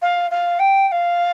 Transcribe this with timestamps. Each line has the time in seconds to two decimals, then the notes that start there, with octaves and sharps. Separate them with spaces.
0.02 F5
0.31 F5
0.59 G5
0.88 G5
0.91 F5